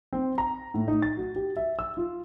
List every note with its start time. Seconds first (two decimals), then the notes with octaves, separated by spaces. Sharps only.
0.13 C4
0.38 A#5
0.74 A2
0.88 D#4
1.02 A6
1.17 F#4
1.36 G4
1.57 E5
1.79 E6
1.97 F4